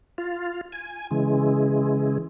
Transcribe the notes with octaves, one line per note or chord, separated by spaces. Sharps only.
F4
G#5
C#3 E3 G#3